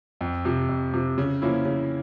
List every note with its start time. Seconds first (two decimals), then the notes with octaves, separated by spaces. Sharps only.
0.21 F2
0.45 C3 F3
0.69 F2
0.94 C3 F3
1.18 C#3
1.42 F3 A#3 C#4 E4
1.65 C#3